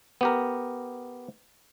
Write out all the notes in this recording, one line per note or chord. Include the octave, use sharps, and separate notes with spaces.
B3 G4 A#4